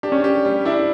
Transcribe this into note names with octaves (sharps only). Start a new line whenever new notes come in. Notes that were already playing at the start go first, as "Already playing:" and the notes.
D4 G4
C#4
D4 G4
G3
D4 E4